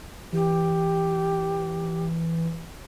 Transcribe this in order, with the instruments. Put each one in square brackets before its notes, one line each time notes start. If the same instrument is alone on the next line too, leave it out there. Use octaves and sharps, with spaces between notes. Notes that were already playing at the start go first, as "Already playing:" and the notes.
[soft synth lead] E3 [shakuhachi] G4